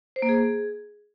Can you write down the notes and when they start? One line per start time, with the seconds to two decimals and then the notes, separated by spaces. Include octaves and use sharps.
0.16 C5
0.22 A#3
0.29 G#4